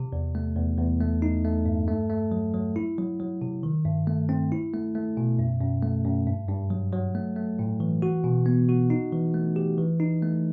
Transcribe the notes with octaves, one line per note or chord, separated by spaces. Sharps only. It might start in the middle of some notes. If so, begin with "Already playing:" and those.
Already playing: C3
E2
A3
E2
E2
A3
D#4
A3
G2
A3
A3
F#3
F#3
E4
F#3
F#3
C3
D#3
G2
A3
C4
E4
A3
A3
B2
F#2
F#2
A3
F#2
G2
G2
F#3
F#3
A3
A3
A2
E3
F#4
B2
B3
F#4
D#4
E3
A3
G4
E3
D#4
A3